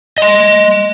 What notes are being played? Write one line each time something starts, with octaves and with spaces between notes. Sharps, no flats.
D#5 C6